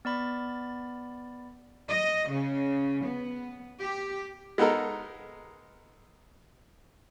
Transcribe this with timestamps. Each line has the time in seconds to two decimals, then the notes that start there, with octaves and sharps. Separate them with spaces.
0.05 B3 D5 B5 A6
1.88 D#5
2.29 C#3
3.03 B3
3.80 G4
4.58 G#3 B3 D#4 A4 A#4